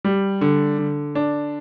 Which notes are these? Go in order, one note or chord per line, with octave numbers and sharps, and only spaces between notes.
G3
D3
D3
D4